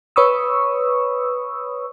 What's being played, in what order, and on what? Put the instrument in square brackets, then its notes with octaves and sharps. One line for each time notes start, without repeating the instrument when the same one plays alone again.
[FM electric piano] B4 C#5 B5 C#6 D#6 E6